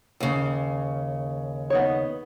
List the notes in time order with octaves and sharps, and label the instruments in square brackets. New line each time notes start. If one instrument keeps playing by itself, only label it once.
[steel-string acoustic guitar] D#2 C#3
[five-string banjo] B3 D#4 C#5